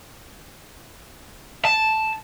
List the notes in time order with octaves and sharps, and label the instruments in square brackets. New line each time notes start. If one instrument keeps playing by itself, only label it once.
[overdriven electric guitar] A5